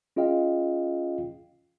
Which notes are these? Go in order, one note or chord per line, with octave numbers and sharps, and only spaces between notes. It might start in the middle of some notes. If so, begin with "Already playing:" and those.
C#4 F4 G#4 D#5 F5 G5